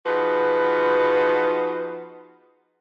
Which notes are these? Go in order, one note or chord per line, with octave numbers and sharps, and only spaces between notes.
F3 B3 D#4 F#4 G#4 B4